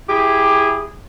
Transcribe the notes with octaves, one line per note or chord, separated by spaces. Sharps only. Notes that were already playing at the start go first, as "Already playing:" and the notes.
E4 G4 G#4